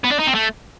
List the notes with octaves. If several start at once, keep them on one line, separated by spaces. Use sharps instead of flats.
B3
D4
D#4
C4
A3